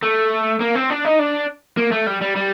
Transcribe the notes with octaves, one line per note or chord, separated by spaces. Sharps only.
A3
A#3
C4
D4
D#4
D4
A#3
A3
G3
G3
G3